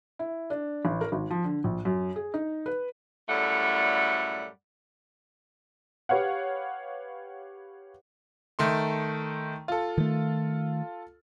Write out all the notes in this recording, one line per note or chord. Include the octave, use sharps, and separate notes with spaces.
E4
D4
A1
A#4
G#1
F3
D3
A#1
F#2
G#4
D#4
B4
F#2 A2 G3 A3 D5 F#5
G4 B4 C#5 F5 F#5
D#3 A3 C6
F4 A4
D#3 A3